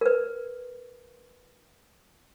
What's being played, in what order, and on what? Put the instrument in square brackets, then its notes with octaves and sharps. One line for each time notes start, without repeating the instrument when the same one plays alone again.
[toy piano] A#4 B4